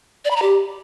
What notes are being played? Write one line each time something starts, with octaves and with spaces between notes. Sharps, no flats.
D5
B5
A#5
G4